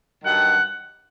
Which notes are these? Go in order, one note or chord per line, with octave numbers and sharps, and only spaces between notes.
G2 D#3 F#3 F#5